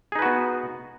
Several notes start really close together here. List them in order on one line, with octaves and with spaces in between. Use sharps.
G#4 D#4 B4 F#4 B3